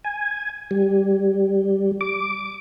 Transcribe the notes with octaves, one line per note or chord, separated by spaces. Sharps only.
G#5
G3
D6